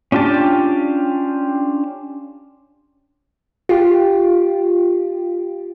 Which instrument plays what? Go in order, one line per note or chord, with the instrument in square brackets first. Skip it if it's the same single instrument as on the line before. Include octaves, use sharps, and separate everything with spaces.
[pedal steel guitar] C#4 D4 F4 G4 A5
[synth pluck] F4 G4